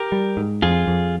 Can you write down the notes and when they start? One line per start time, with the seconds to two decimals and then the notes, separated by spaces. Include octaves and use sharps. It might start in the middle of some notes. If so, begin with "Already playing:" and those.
Already playing: G4 A#4
0.12 G3
0.37 G#2
0.62 F2 F4 G#4
0.87 F2